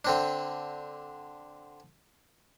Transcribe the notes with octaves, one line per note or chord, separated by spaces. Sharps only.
D3 C4 D4